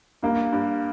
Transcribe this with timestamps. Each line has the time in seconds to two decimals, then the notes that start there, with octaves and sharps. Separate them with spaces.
0.23 G2 A#3
0.52 G2